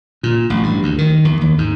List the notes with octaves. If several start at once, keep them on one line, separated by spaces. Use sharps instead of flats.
A#2
A1
G2
D2
D#3
E2
D#2
G#2